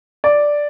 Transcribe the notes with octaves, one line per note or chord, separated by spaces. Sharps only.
D5